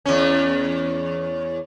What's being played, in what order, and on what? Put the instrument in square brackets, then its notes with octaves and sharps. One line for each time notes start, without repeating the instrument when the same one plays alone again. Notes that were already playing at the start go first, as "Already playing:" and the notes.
[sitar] E2 C#4